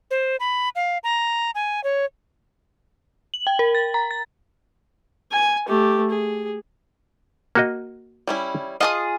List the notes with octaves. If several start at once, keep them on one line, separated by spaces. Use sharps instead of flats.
C5
B5
F5
A#5
G#5
C#5
F#7
G5
A#4
A6
A#5
A6
G#5
A3 G4
G#4
A#3 F#4 D#5
G3 C#4 E4
F4 G#4 D#5 A5 D#6